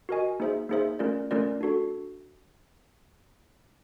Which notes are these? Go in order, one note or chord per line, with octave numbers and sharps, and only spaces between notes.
F#4 A#4 D#5 G#5
A#3 D#4 G#4 C5 E5
A#3 D#4 G#4 C5 E5
A3 C#4 F4 A#4 D5
A3 C#4 F4 A#4 D5
D4 F#4 A4